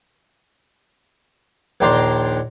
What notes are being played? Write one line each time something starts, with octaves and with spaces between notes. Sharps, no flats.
A#1 D#2 D4 G5 A#5 C6